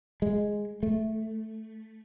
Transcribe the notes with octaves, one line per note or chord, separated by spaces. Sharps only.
G#3
A3